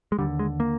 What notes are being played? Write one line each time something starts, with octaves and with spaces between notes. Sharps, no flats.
G#3
D#2 D3 G3
G#3
A#3